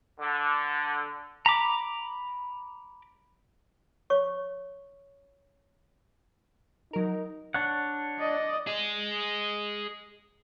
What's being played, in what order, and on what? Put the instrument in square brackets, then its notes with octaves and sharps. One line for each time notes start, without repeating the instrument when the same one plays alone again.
[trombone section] D3
[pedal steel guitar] A#5 B5 D6
[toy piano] C#5 C#6
[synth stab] F#3 A#4 [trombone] D#4
[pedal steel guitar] D4 C#5 F#5
[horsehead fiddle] D5 D#5
[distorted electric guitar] G#4 D#5